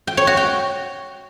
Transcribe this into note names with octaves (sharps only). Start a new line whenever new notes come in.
G5
C#5
F#4
G5